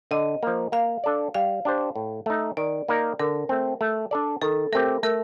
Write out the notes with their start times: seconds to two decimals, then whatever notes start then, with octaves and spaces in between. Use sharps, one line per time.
0.11 D3 D#5
0.43 F3 A#3
0.72 A#3 F5
1.04 D4 A4 D5
1.34 G3 F5
1.65 D4 G4 C5
1.96 A2
2.26 A3 D#4
2.57 D#3 D5
2.88 A#3 D#4 A#4 D5
3.19 D3 A#4
3.49 A3 C4
3.81 A3
4.11 D4 A4 D5
4.42 D#3 A4
4.72 A3 C4 G4 A#4
5.03 A3 A#4